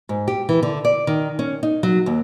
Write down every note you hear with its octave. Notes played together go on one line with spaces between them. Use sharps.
G#2
G4
E3
D3
D5
D#3
C#4
D#4
F#3
D#2